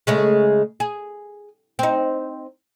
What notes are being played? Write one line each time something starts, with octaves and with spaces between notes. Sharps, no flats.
C#3 G#3 A3
G#4
C4 D#4